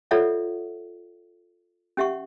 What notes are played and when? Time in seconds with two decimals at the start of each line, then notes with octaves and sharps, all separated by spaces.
0.11 F4 A4 C#5 D5 E5 F#5
1.97 C#4 G4 E5 F#5 C#6